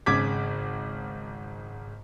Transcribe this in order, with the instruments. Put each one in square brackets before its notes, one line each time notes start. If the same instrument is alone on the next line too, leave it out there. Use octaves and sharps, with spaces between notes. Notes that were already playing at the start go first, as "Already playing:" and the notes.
[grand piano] G#1 C#3 D6 G#6 B6